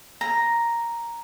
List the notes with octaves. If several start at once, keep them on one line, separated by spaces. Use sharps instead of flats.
A#5